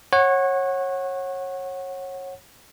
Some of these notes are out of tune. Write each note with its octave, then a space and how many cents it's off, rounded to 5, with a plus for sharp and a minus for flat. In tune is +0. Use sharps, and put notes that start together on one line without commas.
C#5 -25 F#5 +0